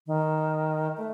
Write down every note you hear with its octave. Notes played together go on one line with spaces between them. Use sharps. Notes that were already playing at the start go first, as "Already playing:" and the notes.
D#3
A3